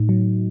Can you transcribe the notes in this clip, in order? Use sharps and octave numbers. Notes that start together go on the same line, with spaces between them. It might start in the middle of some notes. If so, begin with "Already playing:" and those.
Already playing: A2 D#4
F#3